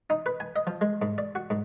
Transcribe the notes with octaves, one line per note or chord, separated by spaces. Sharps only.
D#4
B4
G#5
D#5
F3
G#3
G#2
D5
F#4
G#2